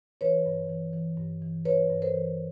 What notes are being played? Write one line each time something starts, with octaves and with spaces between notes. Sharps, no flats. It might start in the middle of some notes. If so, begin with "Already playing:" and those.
E3 B4 C#5
G2
E3
E3
G2
E3
E3 B4 C#5
G2
A#4 C5
E3